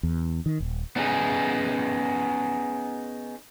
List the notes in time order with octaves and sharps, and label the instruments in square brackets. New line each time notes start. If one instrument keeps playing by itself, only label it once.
[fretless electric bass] E2
D#3
D#1
[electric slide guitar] B3 C#4 D#4 G#4